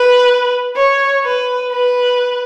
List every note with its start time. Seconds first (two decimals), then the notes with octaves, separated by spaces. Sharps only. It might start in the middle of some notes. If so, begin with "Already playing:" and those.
Already playing: B4
0.76 C#5
1.24 B4
1.72 B4